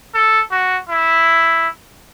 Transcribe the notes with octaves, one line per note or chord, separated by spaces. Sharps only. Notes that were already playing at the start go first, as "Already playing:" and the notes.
A4
F#4
E4